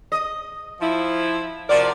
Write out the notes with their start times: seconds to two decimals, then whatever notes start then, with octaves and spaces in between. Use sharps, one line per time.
0.12 D#5
0.81 F3 E4
1.69 C3 F3 F#4 A#4 D5